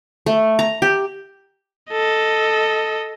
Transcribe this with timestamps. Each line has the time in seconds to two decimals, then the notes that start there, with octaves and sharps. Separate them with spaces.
0.26 A3
0.59 A#5
0.82 G4
1.91 A4 D#5